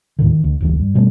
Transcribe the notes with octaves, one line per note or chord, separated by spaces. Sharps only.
D#2 A2 D3 D#3
D#3
D2
F1 D2 E3
G2
B2 G3 A3 C#4